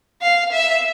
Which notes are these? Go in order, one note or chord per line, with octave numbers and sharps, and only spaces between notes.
F5
E5